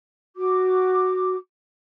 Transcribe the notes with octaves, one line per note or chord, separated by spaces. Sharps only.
F#4 D6